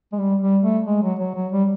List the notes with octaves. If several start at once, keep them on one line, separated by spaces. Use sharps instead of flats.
G#3
G3
G3
A3
G#3
F#3
F#3
F#3
G3